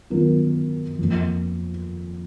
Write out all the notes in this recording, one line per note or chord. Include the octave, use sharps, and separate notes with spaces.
D#3 F#3 B3 F4 A#4
F2 F3 A#3